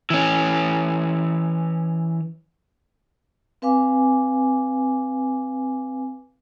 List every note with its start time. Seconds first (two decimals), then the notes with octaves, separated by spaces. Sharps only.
0.10 E3 C#4
3.62 C4 B4 F5 G#5 D6